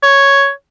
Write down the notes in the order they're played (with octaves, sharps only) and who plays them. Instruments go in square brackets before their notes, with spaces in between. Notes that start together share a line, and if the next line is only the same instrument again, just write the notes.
[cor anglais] C#5